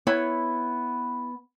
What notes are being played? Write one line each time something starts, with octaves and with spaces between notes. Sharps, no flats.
B3 E4 C#5